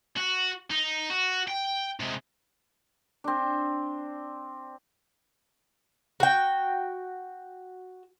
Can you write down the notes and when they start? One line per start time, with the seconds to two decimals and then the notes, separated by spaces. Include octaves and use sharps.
0.17 F#4
0.70 D#4
1.10 F#4
1.48 G5
2.00 C3 G#3
3.24 C4 D4
6.20 F#4 G5